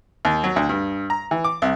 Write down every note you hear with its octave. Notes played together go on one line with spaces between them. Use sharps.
D#2
F#3
D2
G2
A#5
E3
D6
C2